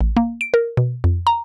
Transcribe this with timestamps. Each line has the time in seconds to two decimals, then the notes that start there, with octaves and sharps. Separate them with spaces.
0.01 A1
0.17 A#3
0.41 D7
0.54 A#4
0.77 B2
1.04 F2
1.27 A#5